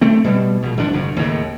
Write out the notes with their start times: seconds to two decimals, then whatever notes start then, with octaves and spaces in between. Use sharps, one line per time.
0.01 A3 C4
0.24 B2 G3
0.62 A#1 B2
0.77 G#1 F3 D4
0.93 F#1 F#2
1.16 D#2 A2 C#3